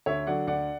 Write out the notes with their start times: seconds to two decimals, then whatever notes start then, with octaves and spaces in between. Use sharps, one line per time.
0.06 D2 C#5 E5
0.27 D3 F#3 D5 F#5
0.47 D2 D5 F#5